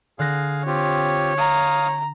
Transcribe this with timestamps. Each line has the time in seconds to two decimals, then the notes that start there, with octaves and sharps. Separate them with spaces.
0.19 D3 G#4 F5 F#6 A#6
0.66 C4 F4 G4 C#5
1.38 F5 A#5 D#6